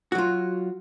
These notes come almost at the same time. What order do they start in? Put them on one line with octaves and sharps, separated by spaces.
F#4 F#3 F4